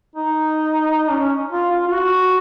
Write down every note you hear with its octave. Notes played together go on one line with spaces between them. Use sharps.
D#4
C#4
F4
F4
F4
F#4